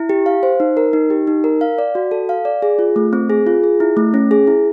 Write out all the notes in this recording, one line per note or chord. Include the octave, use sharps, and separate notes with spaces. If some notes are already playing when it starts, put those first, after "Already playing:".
Already playing: E4
G4
F5
C5
D#4
A#4
D#4
G4
D#4
A#4
F5
D5
F#4
A4
F5
D5
G#4
F4
A3
C4
G#4
F4
G#4
E4
A3
C#4
G#4
E4